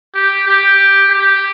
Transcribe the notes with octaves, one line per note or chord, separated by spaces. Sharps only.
G4
G4
G4